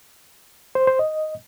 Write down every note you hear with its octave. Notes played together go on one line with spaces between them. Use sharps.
C5
C5
D#5